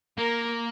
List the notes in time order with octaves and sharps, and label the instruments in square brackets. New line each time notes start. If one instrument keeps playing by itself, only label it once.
[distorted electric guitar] A#3 [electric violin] A#4